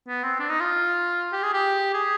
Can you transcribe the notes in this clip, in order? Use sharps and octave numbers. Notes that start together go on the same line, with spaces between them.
B3
C4
D4
D#4
F4
G4
G#4
G4
G#4